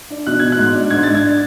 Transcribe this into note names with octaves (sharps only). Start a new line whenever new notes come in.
D4
B2 F#6
B2 G#6
F#6
G#2
D4
G#2 G#6
D4 A6
G#6